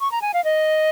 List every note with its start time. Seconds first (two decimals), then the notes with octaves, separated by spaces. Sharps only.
0.01 C#6
0.12 A#5
0.22 G#5
0.34 F5
0.44 D#5